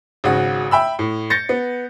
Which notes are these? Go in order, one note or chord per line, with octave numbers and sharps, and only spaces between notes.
G#1 C#3 F#4
E5 G5 B5 E6
A2
G6 A6 A#6 C#7
B3